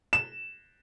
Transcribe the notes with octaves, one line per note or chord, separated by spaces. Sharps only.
E7